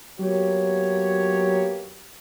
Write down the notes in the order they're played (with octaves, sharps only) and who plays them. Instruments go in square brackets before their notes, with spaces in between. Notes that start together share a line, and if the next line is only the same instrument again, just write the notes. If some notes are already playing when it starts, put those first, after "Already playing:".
[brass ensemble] F#3 A#3 B3 G4 C#5